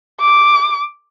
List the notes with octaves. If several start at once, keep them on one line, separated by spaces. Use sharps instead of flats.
D6